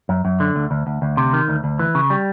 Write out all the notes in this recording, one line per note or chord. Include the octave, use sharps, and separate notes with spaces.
F#2
F#2
D3
D2
D2
D2
D2
C3
D#3
D2
D2
E3
C#3
G3